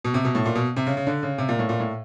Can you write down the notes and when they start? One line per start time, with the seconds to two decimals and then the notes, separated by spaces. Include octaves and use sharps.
0.04 B2
0.14 C3
0.25 B2
0.35 A2
0.45 A#2
0.55 B2
0.76 C3
0.87 C#3
0.97 C#3
1.07 D3
1.23 C#3
1.38 C3
1.49 A#2
1.59 A2
1.69 A#2
1.79 A2